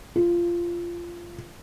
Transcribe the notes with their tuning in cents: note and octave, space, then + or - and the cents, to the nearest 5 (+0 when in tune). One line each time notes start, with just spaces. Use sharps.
F4 -15